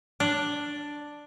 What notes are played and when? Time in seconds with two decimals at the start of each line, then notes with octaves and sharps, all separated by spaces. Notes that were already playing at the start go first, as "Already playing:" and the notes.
0.20 D4